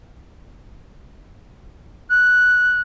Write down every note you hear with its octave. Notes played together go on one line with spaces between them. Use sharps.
F#6